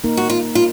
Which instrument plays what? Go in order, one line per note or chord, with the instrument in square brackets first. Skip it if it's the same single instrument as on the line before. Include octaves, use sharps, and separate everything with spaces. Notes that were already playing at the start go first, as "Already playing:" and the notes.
[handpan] A#3 D#4 A#4
[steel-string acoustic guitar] F#4
F4
F4